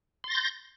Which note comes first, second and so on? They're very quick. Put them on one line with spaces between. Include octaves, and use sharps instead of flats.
C6 A6 A#6 G6